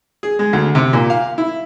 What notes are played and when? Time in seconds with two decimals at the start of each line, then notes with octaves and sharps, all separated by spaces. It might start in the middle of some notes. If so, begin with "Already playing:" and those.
0.23 G#4
0.39 G#3
0.53 D2
0.75 C3
0.93 A#2
1.10 F5
1.38 E4